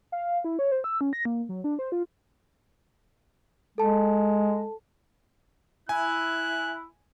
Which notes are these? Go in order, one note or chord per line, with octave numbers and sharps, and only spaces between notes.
F5
E4
C#5
C5
E6
C#4
A#6
A#3
F#3
D4
C5
F4
G#3 A4 A5
E4 G#5 F#6